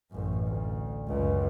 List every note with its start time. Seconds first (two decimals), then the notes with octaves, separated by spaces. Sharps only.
0.11 A1 F#2
0.46 D2
1.07 C#2 F#2